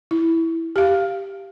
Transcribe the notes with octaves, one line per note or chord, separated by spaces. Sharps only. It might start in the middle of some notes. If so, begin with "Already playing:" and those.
E4
G4 F5